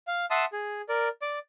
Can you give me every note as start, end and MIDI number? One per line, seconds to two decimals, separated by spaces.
0.07 0.26 77
0.31 0.45 76
0.31 0.45 78
0.31 0.45 81
0.31 0.45 84
0.31 0.45 87
0.53 0.82 68
0.89 1.09 70
0.89 1.09 74
1.22 1.39 74
1.22 1.39 86